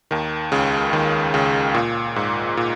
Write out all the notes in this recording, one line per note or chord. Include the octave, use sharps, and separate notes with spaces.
D#2 D#3
C#2 C#3
D#2 D#3
C#2 C#3
A#2
G#2
A#2